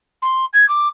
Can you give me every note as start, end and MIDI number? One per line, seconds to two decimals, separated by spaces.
0.22 0.45 84
0.53 0.67 92
0.69 0.88 86